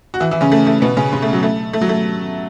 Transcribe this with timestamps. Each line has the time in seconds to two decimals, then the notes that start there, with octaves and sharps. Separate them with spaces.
0.14 F#4
0.20 E3 E4
0.31 E3 E4
0.41 C#3 C#4
0.52 A3
0.67 A3
0.82 B2 B3
0.97 C#3 C#4
1.13 C#3 C#4
1.22 A3
1.33 F#3
1.43 A3
1.73 A3
1.81 F#3
1.89 A3